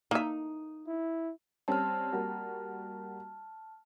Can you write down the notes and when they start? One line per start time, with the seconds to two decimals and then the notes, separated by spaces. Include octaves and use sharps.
0.11 A#3 D#4 E5
0.87 E4
1.68 G3 C4 C#4 A5 F6
2.12 G3 A#3 F#4